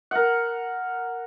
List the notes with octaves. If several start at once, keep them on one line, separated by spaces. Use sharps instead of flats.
A#4 F#5